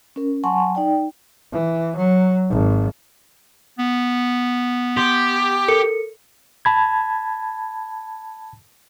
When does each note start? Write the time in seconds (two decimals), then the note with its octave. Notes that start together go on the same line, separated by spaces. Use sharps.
0.16 C#4 A#4
0.44 F#3 F#5 G#5 A5 C6 C#6
0.75 D#4 D5 G5
1.52 E3
1.96 F#3
2.49 G#1
3.79 B3
4.97 G4 C6
5.68 A4 A#4 C#7
6.65 A5 B5 G#6